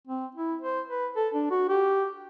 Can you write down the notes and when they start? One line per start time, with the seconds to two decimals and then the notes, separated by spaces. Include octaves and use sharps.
0.07 C4
0.35 E4
0.62 C5
0.88 B4
1.16 A4
1.34 D4
1.51 F#4
1.69 G4